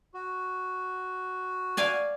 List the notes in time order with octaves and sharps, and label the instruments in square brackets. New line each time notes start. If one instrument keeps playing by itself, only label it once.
[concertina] F#4
[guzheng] D5 F5 G#5